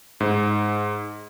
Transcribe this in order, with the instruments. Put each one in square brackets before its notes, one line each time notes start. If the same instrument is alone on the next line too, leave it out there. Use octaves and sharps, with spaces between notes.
[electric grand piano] G#2